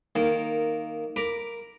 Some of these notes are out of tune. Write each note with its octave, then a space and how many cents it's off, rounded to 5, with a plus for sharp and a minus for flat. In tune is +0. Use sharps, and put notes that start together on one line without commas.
D#3 -5 A#3 -10
A#4 +0 B5 +0 D6 +0